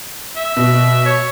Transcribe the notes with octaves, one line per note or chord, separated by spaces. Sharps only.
E5
B2
C#5